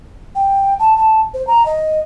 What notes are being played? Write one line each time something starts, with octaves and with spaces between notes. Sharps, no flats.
G5
A5
A5
C5
A#5
D#5